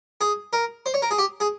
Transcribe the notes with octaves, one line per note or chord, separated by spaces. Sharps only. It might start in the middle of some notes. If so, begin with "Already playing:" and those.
G#4
A#4
C5
C#5
A#4
G#4
G4
G#4